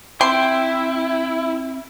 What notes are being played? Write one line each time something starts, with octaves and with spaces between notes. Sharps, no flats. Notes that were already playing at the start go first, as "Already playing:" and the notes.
C4 E4 G5 C6